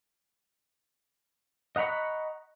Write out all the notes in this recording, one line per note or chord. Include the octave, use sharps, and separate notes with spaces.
D#5 F#5 A#5 B5 C#6